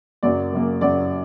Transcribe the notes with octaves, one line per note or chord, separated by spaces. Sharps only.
F#2 C#3 F#3 A#3 D5
F#2 C#3 F#3 A#3
F#2 C#3 F#3 A#3 D5